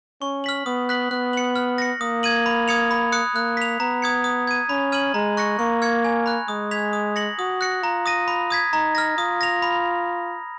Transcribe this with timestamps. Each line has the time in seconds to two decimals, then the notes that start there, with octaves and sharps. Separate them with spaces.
0.22 C#4 C#6
0.44 F6 B6 F#7
0.66 B3 D#6
0.89 F#6 B6 F#7
1.11 B3 F#6
1.33 C#7 F#7
1.56 F6
1.78 A#6 C#7
2.01 A#3 D#6
2.23 G#6 D#7 F#7
2.46 B5
2.68 D#6 G#6 C#7 F7
2.91 B5
3.12 D#6 F#6 C#7
3.35 A#3 F#6
3.57 B6 F7
3.80 B3 A#5
4.02 D#6 G#6 C#7
4.24 D#6
4.47 G#6 D#7
4.69 C#4 B5
4.92 F6 G#6 D#7 F#7
5.14 G#3 A#5
5.37 C#6 F#6 A#6 C#7
5.59 A#3 C#6
5.82 F6 G#6 C#7
6.04 G#5
6.26 B5 F#6
6.48 G#3 D#6
6.71 G#6 B6 F7
6.93 D#6
7.16 A#6 C#7 F#7
7.39 F#4 D#6
7.61 F#6 A#6 C#7
7.83 F4 A#5
8.06 D#6 A#6 D#7
8.28 B5
8.50 D#6 G#6 B6
8.73 D#4 A#5
8.95 F6 A#6
9.18 F4 D#6
9.41 A#6 F7
9.62 B5